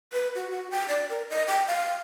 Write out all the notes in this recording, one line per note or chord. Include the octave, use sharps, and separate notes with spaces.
B4
F#4
F#4
G5
D5
A#4
D#5
G5
F5